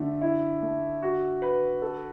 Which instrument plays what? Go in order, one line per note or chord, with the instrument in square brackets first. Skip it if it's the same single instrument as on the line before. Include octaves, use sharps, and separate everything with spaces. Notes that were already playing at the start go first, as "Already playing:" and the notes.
Already playing: [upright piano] D3 [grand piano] A3
[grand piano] E4
A3
F#4
B4
A4